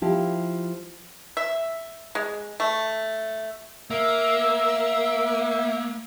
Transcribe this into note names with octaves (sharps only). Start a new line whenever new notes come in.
F3 E4 G4
E5
G#3
A3
A#3 E5 E6